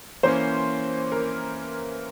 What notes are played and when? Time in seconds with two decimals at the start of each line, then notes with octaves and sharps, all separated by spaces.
0.23 E3 A#3 C#4 C5
1.12 A#4